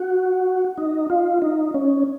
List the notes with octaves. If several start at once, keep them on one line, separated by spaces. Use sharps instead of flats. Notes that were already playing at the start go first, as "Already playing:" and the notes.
Already playing: F#4
D#4
F4
D#4
C#4